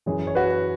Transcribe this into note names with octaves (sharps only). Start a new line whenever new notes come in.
F#2 E3 G#4 C#5
C#5
F#4 B4